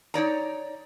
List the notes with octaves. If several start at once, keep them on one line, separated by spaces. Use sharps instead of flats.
D#4 C#5 D5 A#5